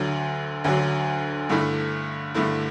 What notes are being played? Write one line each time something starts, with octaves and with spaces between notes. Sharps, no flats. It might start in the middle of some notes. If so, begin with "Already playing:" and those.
Already playing: D2 D3 F#3
D2 D3 F#3
G2 D3 A3 E4
G2 D3 A3 E4